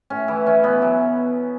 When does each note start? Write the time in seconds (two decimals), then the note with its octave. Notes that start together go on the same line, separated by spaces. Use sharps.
0.10 A2 C#4
0.28 E3 E4
0.46 E3 C#4
0.64 B2 B3
0.82 F#3